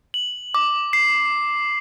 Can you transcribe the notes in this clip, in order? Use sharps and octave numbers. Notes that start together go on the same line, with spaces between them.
F#7
D6
C7